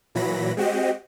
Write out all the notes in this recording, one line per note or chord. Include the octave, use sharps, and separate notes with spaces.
A#2 E3 F#3 B5 A#6
G#3 C4 F#4 G4 D#5